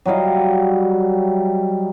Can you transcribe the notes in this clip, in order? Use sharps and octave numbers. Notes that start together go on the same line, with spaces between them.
F#3 G3 D#5 F5